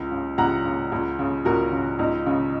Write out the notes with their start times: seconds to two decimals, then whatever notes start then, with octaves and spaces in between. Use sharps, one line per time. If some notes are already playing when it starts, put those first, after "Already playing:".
Already playing: C#2
0.11 C#3
0.38 C#2 F#5 A#5
0.65 C#3
0.92 C#2
1.19 C#3
1.45 C#2 F#4 A#4
1.72 C#3
1.99 C#2 D#4
2.26 C#3